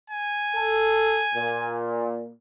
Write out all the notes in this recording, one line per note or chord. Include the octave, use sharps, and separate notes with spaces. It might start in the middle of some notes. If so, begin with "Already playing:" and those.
G#5
A4
A#2